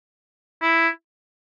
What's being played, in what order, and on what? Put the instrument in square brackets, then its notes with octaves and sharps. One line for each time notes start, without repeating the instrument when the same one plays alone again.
[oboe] E4